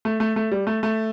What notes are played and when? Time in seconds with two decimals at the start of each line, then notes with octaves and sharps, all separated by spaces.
0.05 A3
0.20 A3
0.36 A3
0.52 G3
0.67 A3
0.83 A3